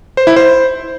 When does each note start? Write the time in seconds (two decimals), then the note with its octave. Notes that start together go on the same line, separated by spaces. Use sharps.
0.17 C5
0.27 E4
0.36 C5